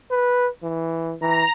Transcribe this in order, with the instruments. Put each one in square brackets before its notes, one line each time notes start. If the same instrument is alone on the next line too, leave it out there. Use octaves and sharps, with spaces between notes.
[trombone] B4
E3
[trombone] E3 [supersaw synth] A#5